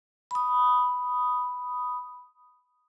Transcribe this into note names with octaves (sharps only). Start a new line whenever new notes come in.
B5 D#6